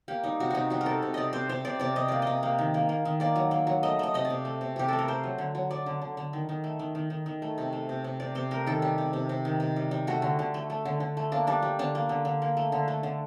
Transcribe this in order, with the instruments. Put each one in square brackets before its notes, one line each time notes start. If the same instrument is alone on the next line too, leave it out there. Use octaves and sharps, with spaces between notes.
[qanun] A#3 G4
G3 D#4
C3 F#4
C3 D#4 F#4
G3 F#4
A#4
C3 A4
C3
C3 D5 D#5
C3 C5
C3 C5
C3 D5
C3 D5
C3 D#5
A#3 D5
C3 D#5
A#3
D#3
A#3
A#3
D#3
A#3 D5
F#3
A#3
F#3
A3 D#5
A3 D#5
C3 D#5
D5
C3
A3
C3
C3 G4
A3 A4
A#4
A3 C5
F#3
D3
F#3
F#3 D5
D3
D3
D3
D#3
D#3
A3
D#3
D#3
D#3
D#3
A3
C3
A3
C3
C3
C3 D5
C3 C5
A3 A#4
D#3 A4
G3 G4
C3
C3
C3
D#3
C3
G3
G3
A3 F#4
D3
D3
A3
A3
D3
D3
A3
A#3 D4
G3 D4
G3
D3 D4
A#3
D3
D3
A#3
A3
D3
A3
D3